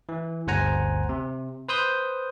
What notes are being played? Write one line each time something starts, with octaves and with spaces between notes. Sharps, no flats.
E3
G1 D2 C5 F#5 G#5 A#5
C3
B4 C5 D#6 G6